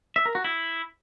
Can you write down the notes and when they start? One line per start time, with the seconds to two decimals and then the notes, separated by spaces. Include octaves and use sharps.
0.16 E5
0.25 A#4
0.35 F#4
0.44 E4